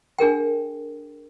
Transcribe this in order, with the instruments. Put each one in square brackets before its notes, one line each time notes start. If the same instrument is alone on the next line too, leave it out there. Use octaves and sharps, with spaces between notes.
[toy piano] D4 G#4 A#4 G5